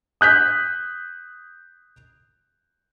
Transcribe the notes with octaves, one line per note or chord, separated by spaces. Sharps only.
D#6 F#6 G6 B6